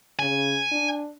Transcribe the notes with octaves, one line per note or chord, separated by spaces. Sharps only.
C#3 G#5
D4